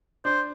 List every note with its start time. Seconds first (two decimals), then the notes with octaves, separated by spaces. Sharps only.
0.25 D4 C5